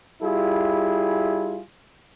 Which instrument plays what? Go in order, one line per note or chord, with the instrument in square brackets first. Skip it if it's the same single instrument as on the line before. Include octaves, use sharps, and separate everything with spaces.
[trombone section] G3 E4 F4 G#4